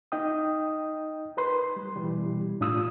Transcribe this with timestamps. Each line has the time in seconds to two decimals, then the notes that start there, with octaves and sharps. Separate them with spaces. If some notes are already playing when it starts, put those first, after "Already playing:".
0.12 D#4 D#5 G5 D#6
1.37 A#4 B4 C6
1.76 G3
1.96 B2 E3 G3
2.60 A2 D4 F4 D#6 E6